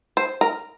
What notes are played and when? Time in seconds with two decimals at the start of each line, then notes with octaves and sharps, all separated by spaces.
0.17 C5
0.41 A#4